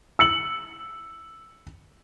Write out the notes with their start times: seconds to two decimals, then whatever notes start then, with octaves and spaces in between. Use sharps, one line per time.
0.19 E6 C#7 F#7